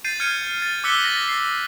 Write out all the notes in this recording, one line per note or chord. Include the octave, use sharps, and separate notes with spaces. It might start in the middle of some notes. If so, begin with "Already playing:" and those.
G6 A6 C7 D#7
F6 G#6 C#7 D#7
A6
D6 E6 F#6 B6 C#7 G7
A6 A#6
C7